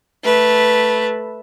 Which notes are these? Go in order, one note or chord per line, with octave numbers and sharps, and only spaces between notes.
A3 B4